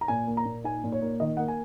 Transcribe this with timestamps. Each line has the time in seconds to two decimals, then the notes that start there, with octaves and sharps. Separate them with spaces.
0.01 A#5
0.08 A#2 G#5
0.27 A#3
0.37 A#5
0.45 A#2
0.64 D#4 G#5
0.84 A#2
0.92 C#5
1.02 A#3
1.20 D#3 D#5
1.37 A#3 F#5
1.48 G#5